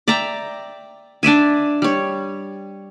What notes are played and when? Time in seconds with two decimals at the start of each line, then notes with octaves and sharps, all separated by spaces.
0.08 D5 E5 G5 A#5
1.23 D4 D5 E5 G#5
1.82 G3 C#5